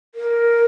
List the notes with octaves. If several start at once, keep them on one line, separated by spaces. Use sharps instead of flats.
A#4